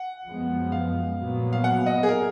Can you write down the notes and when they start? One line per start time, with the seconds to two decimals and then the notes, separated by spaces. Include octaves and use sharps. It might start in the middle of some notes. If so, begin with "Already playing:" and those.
Already playing: F#5
0.26 F#2 F3 G#3 B3
0.72 F5
1.18 A#2 F#3 B3
1.53 F5
1.64 F#5
1.86 D#5
2.03 G#4
2.09 A#4